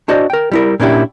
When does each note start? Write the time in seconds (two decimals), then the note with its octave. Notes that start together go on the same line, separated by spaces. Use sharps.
0.08 D4 F#4 C5 D5 D#5
0.30 A#4 G5
0.52 G3 E4 A#4
0.80 A#2 A#3 C#4 D4 E4 G4